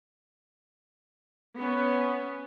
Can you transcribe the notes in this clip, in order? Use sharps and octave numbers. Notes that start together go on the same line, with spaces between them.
B3 C#4